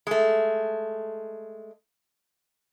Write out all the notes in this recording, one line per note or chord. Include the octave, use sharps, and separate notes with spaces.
G#3 A3